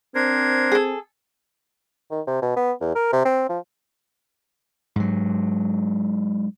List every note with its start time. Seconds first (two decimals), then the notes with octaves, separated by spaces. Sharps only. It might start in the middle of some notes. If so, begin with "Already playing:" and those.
0.15 C4 D4 A#4 C5 G#6
0.72 G#4 A4
2.11 D#3
2.27 C3
2.42 B2
2.56 B3
2.81 E2
2.95 A#4
3.13 C3
3.25 C4
3.49 F3
4.96 G#2 F#3